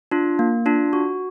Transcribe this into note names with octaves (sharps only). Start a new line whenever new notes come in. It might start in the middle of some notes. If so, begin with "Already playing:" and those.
D4 F4
A#3
D4 F4
F#4